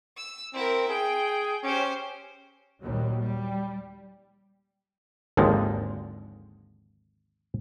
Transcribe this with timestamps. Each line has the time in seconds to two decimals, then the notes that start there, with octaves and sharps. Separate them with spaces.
0.17 E6
0.54 C4 E4 A#4
0.89 G#4 G5
1.63 C#4 G4 C5
2.83 A#1 D#2 F#3 G3
3.20 G3
5.37 G#1 D#2 D3 F3 G#3